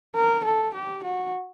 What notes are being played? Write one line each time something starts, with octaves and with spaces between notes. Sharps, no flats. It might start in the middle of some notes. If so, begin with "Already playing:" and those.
A#4
A4
G4
F#4